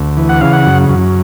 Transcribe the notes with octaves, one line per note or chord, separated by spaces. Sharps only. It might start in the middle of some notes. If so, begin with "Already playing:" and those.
Already playing: D2
E3
F#5
C#3 F5
F#5
F#2
F#2